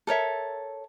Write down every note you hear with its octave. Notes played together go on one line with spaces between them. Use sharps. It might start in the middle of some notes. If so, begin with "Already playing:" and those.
A4 A#4 C#5 E5